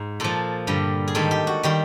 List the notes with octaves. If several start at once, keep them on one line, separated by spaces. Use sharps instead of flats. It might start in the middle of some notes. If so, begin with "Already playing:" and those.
Already playing: G#2
A#2 F3 A4
G2 D3 G3
G#4
G#2 D#3 G3 A4
G4
F#4
D#3 G3 G4